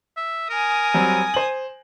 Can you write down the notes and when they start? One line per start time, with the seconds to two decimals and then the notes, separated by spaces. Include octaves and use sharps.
0.17 E5
0.50 A#4 G#5 D#6
0.94 F#3 G3 C4
1.34 C5 F#7